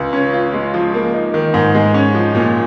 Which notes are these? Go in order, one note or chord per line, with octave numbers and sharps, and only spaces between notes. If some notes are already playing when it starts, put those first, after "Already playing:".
Already playing: C#2
C#4
F4
G#3
F3
A#3
D#4
D#3
G#2
G#3
C#4
F3
A#2